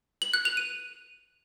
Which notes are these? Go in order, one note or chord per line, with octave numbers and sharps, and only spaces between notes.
F#7
F#6
F7
D#7